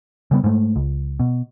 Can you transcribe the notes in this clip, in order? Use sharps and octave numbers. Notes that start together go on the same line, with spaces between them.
C#3 G3 B3
G#2 A3
C#2
B2